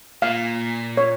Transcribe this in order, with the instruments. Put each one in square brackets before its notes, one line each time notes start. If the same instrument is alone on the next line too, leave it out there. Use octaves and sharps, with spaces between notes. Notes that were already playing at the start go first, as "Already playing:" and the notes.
[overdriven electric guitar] A#2 [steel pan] F5
[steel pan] C#5